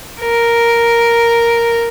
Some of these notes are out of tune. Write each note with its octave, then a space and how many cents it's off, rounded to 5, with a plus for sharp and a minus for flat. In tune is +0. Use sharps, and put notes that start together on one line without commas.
A#4 +0